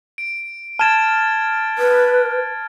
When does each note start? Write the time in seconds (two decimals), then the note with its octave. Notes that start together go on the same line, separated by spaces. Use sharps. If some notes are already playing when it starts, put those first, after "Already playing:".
0.18 D7
0.79 A5 F6 G#6 A6 E7
1.78 B4